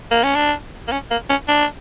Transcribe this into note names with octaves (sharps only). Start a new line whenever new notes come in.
A#3
C#4
D4
A#3
C#4
A#3
C#4
D4